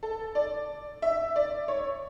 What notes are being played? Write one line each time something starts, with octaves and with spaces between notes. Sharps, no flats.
A4
D5
E5
D5
C#5